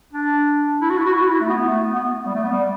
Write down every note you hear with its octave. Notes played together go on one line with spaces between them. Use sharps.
D4
E4
F#4
E4
F#4
E4
F#4
E4
A3
B3
A3
B3
B3
B3
G3
A3
B3
G3